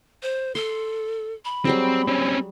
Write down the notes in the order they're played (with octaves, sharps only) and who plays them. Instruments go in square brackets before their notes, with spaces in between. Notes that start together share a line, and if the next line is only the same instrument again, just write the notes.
[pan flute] C5
[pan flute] A4 [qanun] C6
[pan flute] B5
[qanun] F#3 G3 G#4 [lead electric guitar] C4
[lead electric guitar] C4 C#4